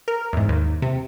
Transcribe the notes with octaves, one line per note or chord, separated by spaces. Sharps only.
A#4
E2 G#2
D#2
C3